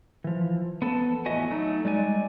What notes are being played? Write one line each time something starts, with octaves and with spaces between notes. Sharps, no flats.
E3 F3
B3 A4 A5
E2 A2 F#4 D#5 E5 G#5
F#3 A3 D#4
G3 G#3 D5 G#5